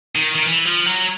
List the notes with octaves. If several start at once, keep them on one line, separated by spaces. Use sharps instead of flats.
D#3
D#3
E3
F3
F#3